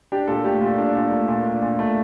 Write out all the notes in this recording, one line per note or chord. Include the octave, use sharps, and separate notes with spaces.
D4 G4
A#2 A4
A3 G4
A#2
D4
A#2
A3
A#2
D4
A#2
A3